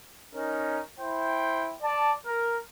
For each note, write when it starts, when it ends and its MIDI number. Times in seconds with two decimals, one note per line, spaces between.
0.34 0.82 61
0.34 0.82 63
0.34 0.82 70
0.99 1.73 64
0.99 1.73 72
0.99 1.73 79
1.82 2.11 74
1.82 2.11 81
2.26 2.57 70